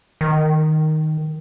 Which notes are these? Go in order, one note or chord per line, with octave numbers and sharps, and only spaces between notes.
D#3